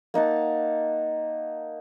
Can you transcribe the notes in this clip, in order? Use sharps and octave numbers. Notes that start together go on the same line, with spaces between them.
A#3 D#4 F#5 A5